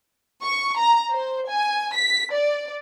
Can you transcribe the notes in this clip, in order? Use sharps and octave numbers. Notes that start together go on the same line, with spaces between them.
C#6
A#5
C5
G#5
B6
D5